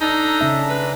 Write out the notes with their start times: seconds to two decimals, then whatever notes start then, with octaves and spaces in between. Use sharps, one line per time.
0.01 D4 D#4 A4 A#5
0.41 C#3 C#4 E5
0.69 B4